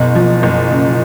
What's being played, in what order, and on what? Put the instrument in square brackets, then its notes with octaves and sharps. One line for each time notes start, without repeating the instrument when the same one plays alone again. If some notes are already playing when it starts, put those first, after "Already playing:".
Already playing: [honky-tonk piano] F#1 [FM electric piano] B2
[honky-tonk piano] F3
F#1
C#3